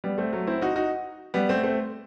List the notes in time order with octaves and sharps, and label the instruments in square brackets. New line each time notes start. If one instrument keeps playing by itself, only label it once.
[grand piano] G3 B3
A3 C4
F#3 A3
C4 E4
D#4 F#4
D#4 F#4
G3 B3
A3 C4
A3 C4